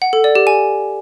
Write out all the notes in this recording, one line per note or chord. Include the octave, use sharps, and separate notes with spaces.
F#5
A4
D5
G4
G#5